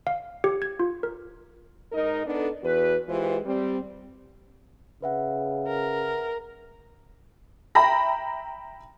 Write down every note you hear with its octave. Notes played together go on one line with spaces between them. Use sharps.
F5
G4
G#6
F4
A#4
G#2 D#4 A#4 D#5
B3 D4 D#4 A4
E2 F#4 B4
E3 G#3 F4 G4 B4 C5
G3 C4 G4
C#3 B4 E5 F#5
A#4
E5 G5 A#5 B5 A#6